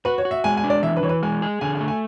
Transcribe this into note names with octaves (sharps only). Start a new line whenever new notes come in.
F#4 B4
C#5
F#4
E5
G#3 G#5
G#5
D4
D5
E3 E5
B4
E3 C#5
B4
G#3 G#5
G#4
D3 G#5
G#5
A3
G#5